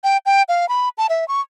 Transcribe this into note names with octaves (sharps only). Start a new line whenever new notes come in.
G5
G5
F5
B5
A5
E5
C#6